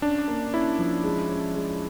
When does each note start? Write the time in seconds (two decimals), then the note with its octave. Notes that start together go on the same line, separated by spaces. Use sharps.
0.02 C#4 D4
0.28 A#3
0.54 C#4 E4
0.79 F3
1.04 G#3
1.29 C#4
1.54 G#3